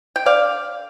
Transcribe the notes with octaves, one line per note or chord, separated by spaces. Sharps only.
G5
D3 D5 F5